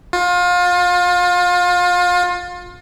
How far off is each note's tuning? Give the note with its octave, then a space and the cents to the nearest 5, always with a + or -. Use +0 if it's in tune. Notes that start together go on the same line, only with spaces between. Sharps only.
F4 +30